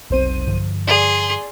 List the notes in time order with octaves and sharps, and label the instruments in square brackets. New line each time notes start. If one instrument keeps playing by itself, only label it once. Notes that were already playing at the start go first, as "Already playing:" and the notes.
[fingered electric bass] F1 C4 [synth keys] B1 C5 D#7
[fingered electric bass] G2 D3 F3
[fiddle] G#4 C6 [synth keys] D5